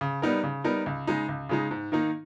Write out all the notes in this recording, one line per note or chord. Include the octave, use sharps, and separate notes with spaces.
C#3
G3 B3 D#4 A#4
C#3
G3 B3 D#4 A#4
C#2
C#3 G#3 D#4
C#2
C#3 G#3 D#4
G#2
D#3 A#3 D#4